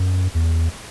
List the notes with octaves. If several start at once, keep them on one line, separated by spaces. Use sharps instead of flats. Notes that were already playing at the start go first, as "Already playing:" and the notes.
Already playing: F#2
E2